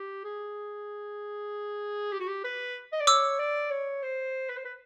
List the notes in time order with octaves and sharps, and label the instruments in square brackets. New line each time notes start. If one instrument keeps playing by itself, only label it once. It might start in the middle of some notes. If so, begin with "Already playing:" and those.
Already playing: [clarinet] G4
G#4
G4
F#4
G4
B4
D#5
D5
[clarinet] C#5 [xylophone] D6 E6
[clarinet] D5
C#5
C5
B4
C5
B4